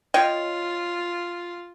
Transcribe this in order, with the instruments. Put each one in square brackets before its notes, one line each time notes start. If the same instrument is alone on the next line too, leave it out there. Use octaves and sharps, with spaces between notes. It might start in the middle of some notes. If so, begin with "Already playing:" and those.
[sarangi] F4 [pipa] C#5 D#5 G5